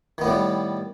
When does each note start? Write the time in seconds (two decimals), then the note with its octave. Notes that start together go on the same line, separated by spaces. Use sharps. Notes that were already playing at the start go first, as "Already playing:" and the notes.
0.18 D#3
0.21 B3
0.24 A2
0.27 G3